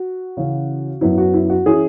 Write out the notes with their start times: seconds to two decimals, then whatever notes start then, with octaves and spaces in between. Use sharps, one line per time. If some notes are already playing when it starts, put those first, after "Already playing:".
Already playing: F#4
0.37 C#3 E3 C#4
1.01 F#2 F#3 B3 E4
1.18 F#4
1.34 E4
1.50 F#4
1.66 E3 C#4 E4 G#4